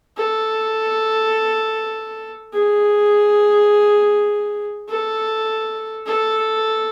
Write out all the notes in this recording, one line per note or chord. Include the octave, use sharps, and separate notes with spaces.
A4
G#4
A4
A4